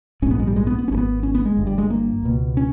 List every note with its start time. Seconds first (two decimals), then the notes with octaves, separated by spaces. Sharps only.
0.22 A#1 G#2 C#4
0.31 B3
0.39 G#3
0.47 G3
0.56 G#3
0.67 B3
0.79 B3
0.88 G#1 G2 C#4
0.98 B3
1.23 C#4
1.35 B3
1.45 G#3
1.57 G1 G2
1.67 G3
1.78 G#3
1.90 A#3
2.23 C#2 B2
2.57 C#4